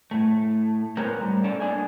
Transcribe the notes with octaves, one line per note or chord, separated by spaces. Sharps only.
A2 A3
G#3 B3 G4 A#4 C5 C#5
A2 G3
C#4 A4 D5
A#3 D4 D5 D#5 G#5